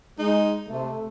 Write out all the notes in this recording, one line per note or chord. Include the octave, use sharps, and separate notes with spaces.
G#3 D#4
C3 A3